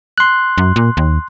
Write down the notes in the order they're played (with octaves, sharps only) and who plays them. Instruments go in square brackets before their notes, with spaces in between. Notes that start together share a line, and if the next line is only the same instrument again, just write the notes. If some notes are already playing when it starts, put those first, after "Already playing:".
[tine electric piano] C6 F#6
[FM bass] F#2
A#2
D#2